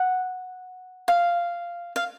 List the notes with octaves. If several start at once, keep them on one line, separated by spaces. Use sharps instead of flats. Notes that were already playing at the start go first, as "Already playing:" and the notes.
Already playing: F#5
F5
F5